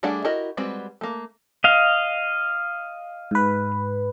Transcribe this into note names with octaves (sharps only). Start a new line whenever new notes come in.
G3 A3 D4 G#4 F#5
E4 F#4 G4 A#4 D#5
G3 G#3 C4 F#4 B4
A3 A#3
D#5 F5
G#2 B4